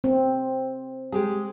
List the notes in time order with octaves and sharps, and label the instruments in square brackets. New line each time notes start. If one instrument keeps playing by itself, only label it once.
[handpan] C4
[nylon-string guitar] G#3 G4 G#4